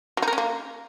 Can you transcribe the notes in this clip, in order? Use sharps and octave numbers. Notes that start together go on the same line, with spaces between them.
F#3
D#4
A#4
C#4
A#3